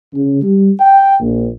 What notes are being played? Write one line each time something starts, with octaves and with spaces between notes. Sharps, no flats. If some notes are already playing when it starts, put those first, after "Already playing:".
C#3
G3
G5
A#1